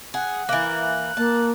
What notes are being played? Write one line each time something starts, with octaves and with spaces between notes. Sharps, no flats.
G#4 F#5
E3 A#3 F#6
A#3 A5